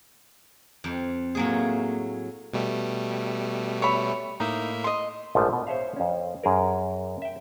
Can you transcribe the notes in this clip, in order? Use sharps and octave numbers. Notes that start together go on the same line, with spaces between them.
F2
A2 F#3 A#3 G#4
B2 G3 A3
C#5 E5 B5
A2 A#3 D#4 D#5 E5 A#5
D#5 C6
A#1 G#2 F3 A3
B2
C5 C#5 E5 F5
F2 C4 C#4
F#2 G#4 A#4
E5 G5